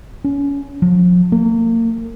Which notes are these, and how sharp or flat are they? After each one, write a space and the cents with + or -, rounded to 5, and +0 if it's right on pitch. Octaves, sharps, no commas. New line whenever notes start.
C#4 +25
F3 +40
A#3 -35